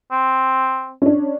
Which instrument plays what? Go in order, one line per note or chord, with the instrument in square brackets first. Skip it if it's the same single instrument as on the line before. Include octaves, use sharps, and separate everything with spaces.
[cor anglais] C4
[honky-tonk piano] C#4 D4